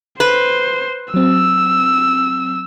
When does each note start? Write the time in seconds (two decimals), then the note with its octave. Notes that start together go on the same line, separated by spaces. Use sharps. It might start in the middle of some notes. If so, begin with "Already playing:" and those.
0.20 B4 C5
1.14 F#3 C4 E6